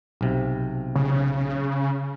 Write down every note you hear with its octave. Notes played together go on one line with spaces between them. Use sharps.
B1 C3
C#3